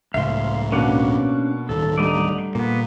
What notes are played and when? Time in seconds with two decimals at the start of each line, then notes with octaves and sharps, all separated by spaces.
0.14 C#2 A2 E5 F5 C6
0.72 B2 A#3 C#4 D4 F#5
1.69 D1 D#3 A4
1.98 D3 G3 A3 D5 D#5 A#5
2.55 A#2 A#3 B3